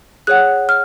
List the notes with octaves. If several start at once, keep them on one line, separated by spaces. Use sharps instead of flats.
G#4 C#5 F#5 F#6
F6